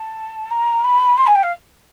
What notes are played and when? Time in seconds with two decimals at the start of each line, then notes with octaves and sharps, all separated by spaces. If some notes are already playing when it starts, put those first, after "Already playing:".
Already playing: A5
0.51 A#5
0.84 B5
1.17 C6
1.27 G#5
1.35 G5
1.43 F5